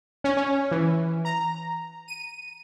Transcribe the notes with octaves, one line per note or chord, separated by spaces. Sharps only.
C#4
C#4
E3
A#5
D#7